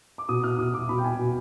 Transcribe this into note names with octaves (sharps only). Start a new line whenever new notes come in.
D6
B2 D#6
B2 F6
B2 D#6
B2 D6
B2 B5
G5
B2 G#5
B2